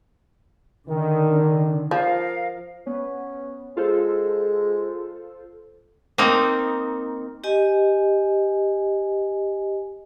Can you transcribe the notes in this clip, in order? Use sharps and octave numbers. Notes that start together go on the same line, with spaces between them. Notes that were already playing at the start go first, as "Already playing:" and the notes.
D3 D#3
F3 A#4 F5
B3 C#4
G#3 F4 A4 C5
A#3 C4 D#4
G4 D#5 G#5